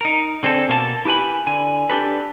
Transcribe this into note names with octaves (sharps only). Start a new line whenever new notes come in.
D#4 A#4
D3 C4 G#4 A4
B2 A#3 C5 A5
E4 G4 B4 G#5 B5
D3 G#5
D4 G4 A4 B4